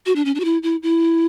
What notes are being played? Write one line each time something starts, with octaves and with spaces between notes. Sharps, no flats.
F#4
D4
C#4
D4
F#4
E4
E4
E4